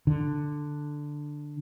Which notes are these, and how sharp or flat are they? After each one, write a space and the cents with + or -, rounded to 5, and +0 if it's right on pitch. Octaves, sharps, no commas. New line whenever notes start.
D3 +5